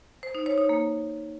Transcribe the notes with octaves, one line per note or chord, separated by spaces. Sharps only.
C5
D#4
C#5
D#4
A#3